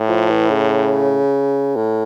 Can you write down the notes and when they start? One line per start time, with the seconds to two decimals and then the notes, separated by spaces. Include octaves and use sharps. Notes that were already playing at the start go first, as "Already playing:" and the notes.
Already playing: A2
0.09 F3
0.30 E3
0.50 C#3
1.76 A2